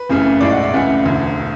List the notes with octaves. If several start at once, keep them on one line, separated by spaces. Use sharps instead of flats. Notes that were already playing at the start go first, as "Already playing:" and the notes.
Already playing: B4
F#1 F#2 C#3 E3 A3
B1 A2 G#3 D5
F#5
E5
C#2 C#3 E3 A3 F#5
E1 D2 D3